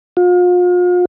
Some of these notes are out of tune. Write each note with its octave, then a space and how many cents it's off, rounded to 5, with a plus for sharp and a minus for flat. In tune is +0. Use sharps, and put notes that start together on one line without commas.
F4 +40